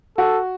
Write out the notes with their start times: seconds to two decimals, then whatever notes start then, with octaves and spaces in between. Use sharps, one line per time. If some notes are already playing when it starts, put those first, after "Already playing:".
0.18 F#4 A4